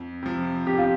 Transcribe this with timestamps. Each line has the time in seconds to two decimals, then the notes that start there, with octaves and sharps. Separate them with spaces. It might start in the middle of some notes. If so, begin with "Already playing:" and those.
Already playing: F2
0.23 C3 F3
0.66 F2 G4
0.78 F4